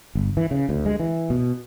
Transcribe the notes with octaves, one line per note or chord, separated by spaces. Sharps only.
G1
E3
C#3
D2
G#3
E3
B2